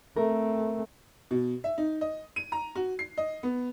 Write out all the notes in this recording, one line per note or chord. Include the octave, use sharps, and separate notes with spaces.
A3 C4 A#4
B2
E5
D#4
D#5
D#7
A#5
F#4
C7
D#5
B3